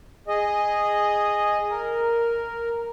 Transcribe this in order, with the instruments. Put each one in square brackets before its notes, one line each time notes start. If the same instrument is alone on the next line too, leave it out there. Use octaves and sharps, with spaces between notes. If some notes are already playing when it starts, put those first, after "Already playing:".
[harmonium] G#4 D#5
A#4